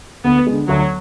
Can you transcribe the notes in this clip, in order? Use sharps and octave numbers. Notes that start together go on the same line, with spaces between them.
D2 B3
D3 G#3
D2 F#3